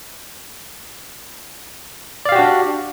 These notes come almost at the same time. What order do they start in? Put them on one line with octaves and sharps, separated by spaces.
D5 F5 G4 F#4 D4